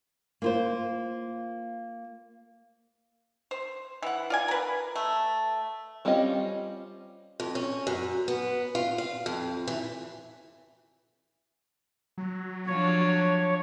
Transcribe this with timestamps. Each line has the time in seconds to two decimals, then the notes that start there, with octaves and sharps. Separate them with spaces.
0.42 A#3 F4 C5
3.51 C5
4.02 E3 F#5
4.30 F4 D5 G#5
4.48 A#4 B4
4.95 A3
6.05 G3 C4 C#4 F4 D#5
7.40 F2
7.55 C#4
7.87 F#2
8.28 B3
8.75 F4
8.98 F5
9.26 F2
9.68 E3
12.18 F#3
12.67 F3 D4 C#5